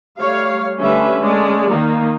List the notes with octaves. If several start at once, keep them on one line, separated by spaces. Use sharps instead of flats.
G3 A3 C#5 F5
D3 G3 A3 C#4 B4 E5
G#3 A3 C#4 D5
D#3 A#3 D#4